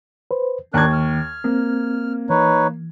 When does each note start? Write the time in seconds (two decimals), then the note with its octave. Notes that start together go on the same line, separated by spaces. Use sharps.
0.31 B4 C5
0.74 D#2 D#3 D4 A#4 F#6 G#6
0.93 F6
1.44 A#3 C4
2.30 E3 D#4 B4 C#5